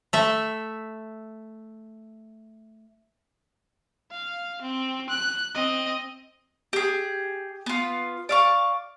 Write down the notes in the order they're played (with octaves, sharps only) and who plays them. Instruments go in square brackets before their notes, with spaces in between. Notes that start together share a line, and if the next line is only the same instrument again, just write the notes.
[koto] A3 E5
[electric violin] F5
C4
F#6
C4 D#5
[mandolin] G4 G#4
B3 F4
D5 F5 C#6